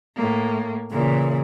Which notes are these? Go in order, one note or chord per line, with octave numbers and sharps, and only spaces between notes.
A2 A#3
A#2 C#3 E3